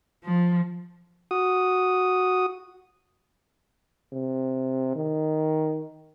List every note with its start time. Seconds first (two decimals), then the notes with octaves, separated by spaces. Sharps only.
0.25 F3
1.31 F#4 D#6
4.12 C3
4.96 D#3